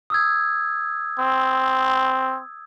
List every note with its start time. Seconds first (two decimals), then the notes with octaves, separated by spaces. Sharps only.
0.10 D#6 E6 G#6
1.19 C4